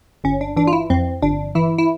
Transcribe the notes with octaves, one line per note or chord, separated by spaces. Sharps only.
G1 C#4
D4
E3 D4
F4
E4
F2 C4
G1 D4
E3 E4
E4